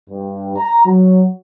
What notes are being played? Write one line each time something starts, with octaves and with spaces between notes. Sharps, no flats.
G2
A#5
F#3